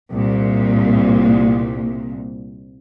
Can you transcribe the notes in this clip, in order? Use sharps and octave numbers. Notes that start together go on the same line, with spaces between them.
C2 A#2